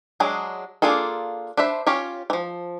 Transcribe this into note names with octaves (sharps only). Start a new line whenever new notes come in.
F#3 G#3 D4 G#4
A#3 D4 F4 G#4 A4
D4 B4 C5 E5
C#4 F4 G4 C#5
E3 F3